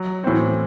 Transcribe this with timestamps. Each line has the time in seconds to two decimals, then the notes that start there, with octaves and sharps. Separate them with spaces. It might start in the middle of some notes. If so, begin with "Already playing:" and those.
Already playing: F#3
0.24 A2 E3 C4 F#4